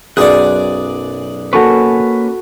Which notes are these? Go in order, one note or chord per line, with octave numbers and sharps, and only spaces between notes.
B1 F#2 G#4 D5 F#6
A#3 C#4 F#4 A4 B4 C#6